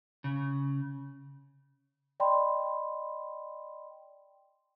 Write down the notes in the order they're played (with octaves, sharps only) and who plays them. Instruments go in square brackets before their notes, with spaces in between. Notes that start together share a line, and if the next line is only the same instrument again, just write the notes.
[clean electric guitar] C#3
[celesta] D5 D#5 G5 B5 C6